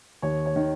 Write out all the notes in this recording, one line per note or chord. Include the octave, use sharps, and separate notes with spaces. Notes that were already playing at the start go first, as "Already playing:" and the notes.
D#2 C#5
C#5
D#3